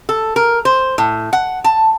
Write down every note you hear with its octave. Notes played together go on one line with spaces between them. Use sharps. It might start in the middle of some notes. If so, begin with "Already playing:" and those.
A4
A#4
C5
A2
F#5
A5